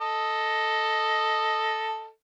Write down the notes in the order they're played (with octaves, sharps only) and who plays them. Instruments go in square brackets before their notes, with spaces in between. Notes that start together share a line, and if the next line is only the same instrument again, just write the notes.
[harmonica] A4 D#5